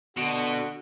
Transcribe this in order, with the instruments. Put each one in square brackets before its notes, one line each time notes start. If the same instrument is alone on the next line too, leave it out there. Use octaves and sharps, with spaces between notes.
[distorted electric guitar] B2 [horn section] D3 F#4